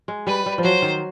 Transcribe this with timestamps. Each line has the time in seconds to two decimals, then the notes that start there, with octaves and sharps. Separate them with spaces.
0.08 G#3
0.27 G3 B4
0.46 G3
0.58 F3
0.64 F#3 C5
0.82 D#3